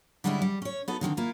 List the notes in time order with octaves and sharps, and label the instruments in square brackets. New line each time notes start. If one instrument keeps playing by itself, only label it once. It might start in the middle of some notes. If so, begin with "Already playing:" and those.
[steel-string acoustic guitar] D3 G3 G#3 C#4 D4 E4
G3
C#4 C#5
B3 D#4 F#4 A4
D3 D#3 G3 C4
A#3 E4 F4